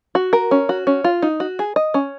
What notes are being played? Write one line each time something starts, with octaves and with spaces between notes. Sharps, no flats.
F#4
A#4
C#4
F#4
C#4
F4
D#4
F#4
G#4
D#5
C#4